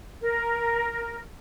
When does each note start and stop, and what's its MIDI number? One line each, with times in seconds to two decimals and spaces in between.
0.21 1.20 70